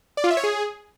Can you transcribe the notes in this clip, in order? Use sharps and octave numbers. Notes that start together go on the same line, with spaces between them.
D5
F4
E5
C#5
G#4